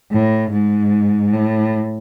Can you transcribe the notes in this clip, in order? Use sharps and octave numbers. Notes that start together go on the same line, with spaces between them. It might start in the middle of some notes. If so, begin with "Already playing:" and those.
A2
G#2
A2